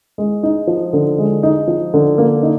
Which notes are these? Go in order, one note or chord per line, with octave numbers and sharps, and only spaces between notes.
G#3
D#4
F3
D3
G#3
D#4
F3
D3
A#3
D#4